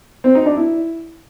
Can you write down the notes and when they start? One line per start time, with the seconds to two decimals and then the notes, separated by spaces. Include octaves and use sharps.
0.24 C4
0.35 D#4
0.46 D4
0.57 E4